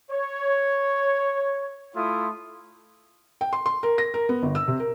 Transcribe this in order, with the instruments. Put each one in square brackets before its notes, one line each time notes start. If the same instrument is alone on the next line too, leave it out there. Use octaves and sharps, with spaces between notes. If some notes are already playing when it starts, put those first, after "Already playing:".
[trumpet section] C#5
A3 E4 F4 C6 D#6
[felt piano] G5
C6
C6
A#4
A#6
A#4
B3
G1
E6
C3
A#4